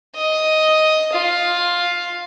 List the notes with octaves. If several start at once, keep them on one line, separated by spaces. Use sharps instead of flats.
D#5
F4